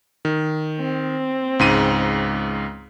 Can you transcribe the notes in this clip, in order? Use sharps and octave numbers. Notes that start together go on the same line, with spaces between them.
D#3
C4
C#2 G#2 D#7